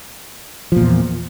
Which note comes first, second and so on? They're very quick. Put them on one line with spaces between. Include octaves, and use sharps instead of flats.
F3 A#2 E2